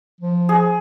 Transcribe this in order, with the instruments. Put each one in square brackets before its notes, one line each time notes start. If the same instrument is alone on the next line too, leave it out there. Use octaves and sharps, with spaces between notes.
[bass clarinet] F3
[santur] G#4